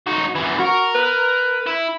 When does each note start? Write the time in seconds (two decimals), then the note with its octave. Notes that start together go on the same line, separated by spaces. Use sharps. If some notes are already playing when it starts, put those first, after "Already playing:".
0.07 D#4 F#4
0.35 F#2 E3
0.59 F#4 A#4
0.95 B4
1.67 E4